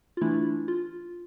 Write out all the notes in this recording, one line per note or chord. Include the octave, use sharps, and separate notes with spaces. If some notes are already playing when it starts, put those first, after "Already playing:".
F4
E3 A3 D4 E4
F4